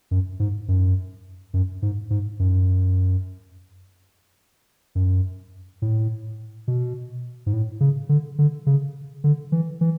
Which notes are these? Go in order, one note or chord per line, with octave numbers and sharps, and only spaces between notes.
F#2
G#2
F#2
F#2
G#2
G#2
F#2
F#2
A2
B2
G#2
A2
C#3
D3
D3
C#3
D3
E3
E3